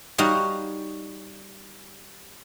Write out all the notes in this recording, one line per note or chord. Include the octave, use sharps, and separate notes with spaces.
G3 D#4 F#4 C#5 F5